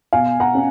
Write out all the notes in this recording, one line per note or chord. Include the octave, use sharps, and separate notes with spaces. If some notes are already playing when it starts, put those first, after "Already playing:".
B2 F5 G#5
F#5 A#5
C#4